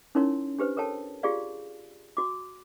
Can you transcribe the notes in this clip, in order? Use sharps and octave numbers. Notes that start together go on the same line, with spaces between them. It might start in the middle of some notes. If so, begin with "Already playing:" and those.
C#4 D#4 E4 A#4 C#5 C6
D4 G4 B4 C5
A4 A#4 C#5 G5 A5
F4 G4 G#4 D5 F5
F#4 D6